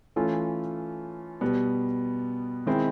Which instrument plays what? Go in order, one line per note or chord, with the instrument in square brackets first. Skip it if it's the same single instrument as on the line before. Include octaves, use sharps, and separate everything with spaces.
[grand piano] E3 A3 C#4 F4 A4
B2 G3 B3
D#3 G#3 C4 E4